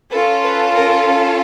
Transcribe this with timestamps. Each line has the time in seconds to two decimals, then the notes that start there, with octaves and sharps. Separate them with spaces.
0.12 C#4 F4 A4 B4
0.43 B4
0.75 A#4